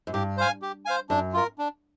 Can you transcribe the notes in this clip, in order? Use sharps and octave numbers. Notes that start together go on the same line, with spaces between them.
F#2
G2 G4
C5 F5 G#5
G4
C5 F5 G#5
F#2 D4
F4 A#4
D4